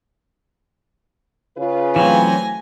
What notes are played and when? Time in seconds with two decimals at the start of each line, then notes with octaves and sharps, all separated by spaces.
1.57 C#3 F4 B4
1.96 E3 F#3 A3 C4 G#5 A#6